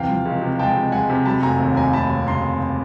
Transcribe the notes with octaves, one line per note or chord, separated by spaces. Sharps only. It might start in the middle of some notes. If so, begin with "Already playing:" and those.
Already playing: C3 E3 F5 G5
F3
C#2
C3
G#3 G5 A5
C3
G#3 F#5 G#5
C3
F#3 A5 B5
F1 G#5 A#5
D#2
D#2 G#5 A#5
F1 A5 B5
D#2
C#3 A#5 C6